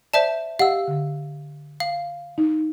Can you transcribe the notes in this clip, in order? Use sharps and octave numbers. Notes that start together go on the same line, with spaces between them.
C5 D5 E5 A5
G4 D#5 F5 F#5 E6
D3
F5
D#4